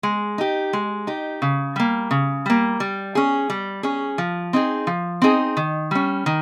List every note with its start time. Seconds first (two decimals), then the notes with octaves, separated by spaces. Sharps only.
0.03 G#3
0.38 D#4 G4
0.73 G#3
1.07 D#4 G4
1.42 C#3
1.76 G3 A#3
2.11 C#3
2.46 G3 A#3
2.80 G3
3.15 C#4 G#4
3.50 G3
3.83 C#4 G#4
4.18 F3
4.53 C4 D#4 G#4
4.87 F3
5.22 C4 D#4 G#4
5.57 D#3
5.91 G3 C#4
6.26 D#3